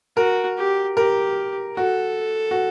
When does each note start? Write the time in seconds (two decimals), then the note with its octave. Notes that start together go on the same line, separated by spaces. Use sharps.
0.17 F#4 A#4
0.57 G4
0.97 G4 A#4
1.77 F#4 A4
2.51 F#4